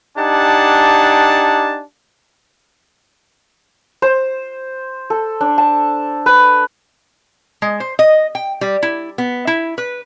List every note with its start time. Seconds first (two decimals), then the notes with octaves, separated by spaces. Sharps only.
0.17 D4 D#4 G4 F#5 G#5 A5
4.02 C5
5.10 A4
5.41 D4
5.58 A5
6.26 B4
7.62 G#3
7.80 C5
7.99 D#5
8.35 G5
8.61 G3
8.83 E4
9.18 B3
9.47 E4
9.78 B4